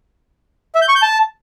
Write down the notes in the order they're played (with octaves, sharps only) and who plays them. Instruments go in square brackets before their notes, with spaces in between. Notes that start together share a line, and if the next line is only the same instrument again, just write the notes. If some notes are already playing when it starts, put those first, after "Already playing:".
[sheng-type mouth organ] E5
G6
C#6
G6
A5